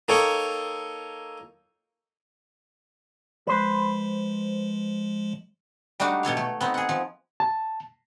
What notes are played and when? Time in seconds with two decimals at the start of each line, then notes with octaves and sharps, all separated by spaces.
0.08 A#3 D#4 A4 C#5 G5
3.47 F3 G#3 B4 C5
6.00 G3 A3 D4 D#4 F#4
6.23 B2 A4 C#5 F5
6.37 A3
6.61 B3 C4 D#4
6.74 G#4 F#5
6.89 F3
7.40 A5